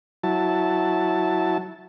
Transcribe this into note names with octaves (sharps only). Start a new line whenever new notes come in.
F#3 E4 A5